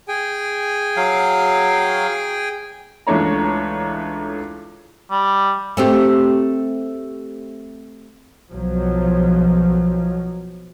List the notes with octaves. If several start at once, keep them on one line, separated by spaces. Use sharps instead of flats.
G#4 G5 G#5
F#3 F5
C#2 E3 A3 D4 C#5 A#5
G3
A3 C4 G4
B1 F3 F#3